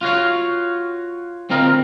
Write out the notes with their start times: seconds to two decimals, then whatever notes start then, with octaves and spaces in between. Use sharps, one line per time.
0.01 F4 F#4 C#5 F5
1.50 D2 C4 F4 A#4 D#5